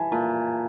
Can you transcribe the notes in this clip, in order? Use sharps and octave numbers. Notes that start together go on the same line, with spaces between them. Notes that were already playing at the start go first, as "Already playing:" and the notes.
Already playing: E3 G#5 A5
A#2 A5